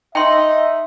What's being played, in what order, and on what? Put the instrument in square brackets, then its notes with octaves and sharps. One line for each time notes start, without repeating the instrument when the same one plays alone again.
[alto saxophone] D#4 [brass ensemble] E5 [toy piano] G5 C6